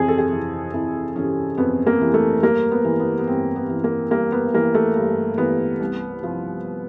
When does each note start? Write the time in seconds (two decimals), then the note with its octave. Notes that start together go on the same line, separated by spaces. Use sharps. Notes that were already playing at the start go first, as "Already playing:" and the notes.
Already playing: F2 C3 E3 G#4
0.08 A4
0.18 G#4
0.31 C3 E3
0.73 F2 E4
1.16 C3 E3 C#4
1.58 F2 B3
1.86 A#3
2.01 C3 E3
2.14 A3
2.42 G2 A#3
2.71 B3
2.84 E3
3.00 B3
3.18 B3
3.27 G2 C4
3.56 B3
3.69 E3
3.84 A#3
4.11 G2 A#3
4.32 B3
4.54 E3 A#3
4.75 A3
4.96 G2
5.38 E3 B3
5.80 C2
6.23 C3 F3